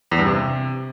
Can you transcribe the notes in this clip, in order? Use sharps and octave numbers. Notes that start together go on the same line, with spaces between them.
E2
G2
C3